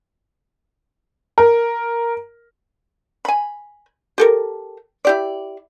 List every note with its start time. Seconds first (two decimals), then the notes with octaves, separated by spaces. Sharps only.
1.38 A#4
3.25 G#5 B5
4.18 G4 A4 A#4
5.05 E4 G4 D5